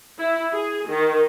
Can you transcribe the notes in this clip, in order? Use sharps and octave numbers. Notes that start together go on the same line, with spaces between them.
E4
G#4
D#3